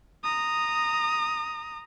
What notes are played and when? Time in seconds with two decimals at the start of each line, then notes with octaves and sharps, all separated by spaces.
0.24 A#5 D#6